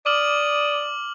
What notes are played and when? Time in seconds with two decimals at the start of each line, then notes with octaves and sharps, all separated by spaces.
0.06 D5 D6 D#6 F6 F#7